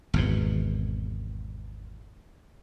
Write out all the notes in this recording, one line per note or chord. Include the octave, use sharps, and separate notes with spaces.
G#1 E2 B2